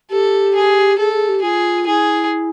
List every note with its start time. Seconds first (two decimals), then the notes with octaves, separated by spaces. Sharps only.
0.10 G4 A4
0.55 G#4
0.98 G#4 A4
1.13 G#4
1.28 G4
1.42 F4 G#4
1.87 E4 G#4